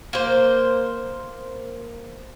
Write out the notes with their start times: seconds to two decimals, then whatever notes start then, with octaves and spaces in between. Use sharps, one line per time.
0.13 A#3 C5